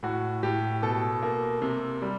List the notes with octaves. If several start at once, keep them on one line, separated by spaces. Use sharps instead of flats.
A2 F#4
A2 G4
B2 A4
A#3
C3
G3